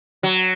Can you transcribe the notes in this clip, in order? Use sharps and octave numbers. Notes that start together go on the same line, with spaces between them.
F#3